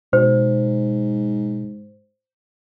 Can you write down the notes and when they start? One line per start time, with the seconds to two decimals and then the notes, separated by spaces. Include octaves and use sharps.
0.13 G#2 B2 C5